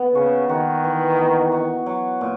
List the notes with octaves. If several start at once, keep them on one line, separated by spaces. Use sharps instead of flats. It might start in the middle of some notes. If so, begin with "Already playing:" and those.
Already playing: B3
C#3 F#4
D#3 F#4
E3
B3
F#4
F#3
A#2